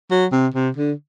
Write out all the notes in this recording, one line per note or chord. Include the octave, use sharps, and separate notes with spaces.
F#3
C3
C3
D3